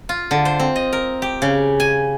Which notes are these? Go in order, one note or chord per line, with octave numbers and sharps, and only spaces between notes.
F4
D3
C5
C4
D#5
A#4
G4
C#3
G#5